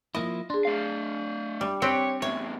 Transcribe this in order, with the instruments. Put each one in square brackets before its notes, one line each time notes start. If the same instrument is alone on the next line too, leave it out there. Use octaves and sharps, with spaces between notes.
[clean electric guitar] F3 A#3 E4 [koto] D#5
[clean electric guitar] D4 [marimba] G#4 C6
[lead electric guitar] A3 F5
[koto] G3
[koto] C4 G4 B4 [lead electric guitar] C#5
[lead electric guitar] E2 A2 [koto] C#5 [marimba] E5